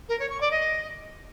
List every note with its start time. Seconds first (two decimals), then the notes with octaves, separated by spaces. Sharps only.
0.09 A#4
0.19 C#5
0.30 C#6
0.41 D5
0.51 D#5